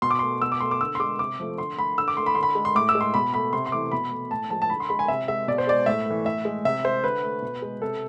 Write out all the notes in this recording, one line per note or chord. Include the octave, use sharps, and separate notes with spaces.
B2 C6
D6
A3 C6
B2 E6
D6
A3 C6
D6
D3 E6
C6
G#3 D6
C3 D6
F3 A3
D3 C6
A3 B5
D3 E6
D6
A3 C6
B5
D3 C6
B5
G#3
C6
A2 D6
E6
G#3
C6
B2 B5
A3 B5
C3 C6
C6
E3 A3 D6
B2 B5
A3
A2 A5
F3 G#3 A5
A5
D3 B5
C6
G#3 B5
G#5
C3 E5
G#3 E5
B2 D5
C5
G#3 D5
A2 E5
E3 A3
A2 E5
G#3
C3 E5
G#3 C5
D3 B4
A3
B2
G#3
C3 A4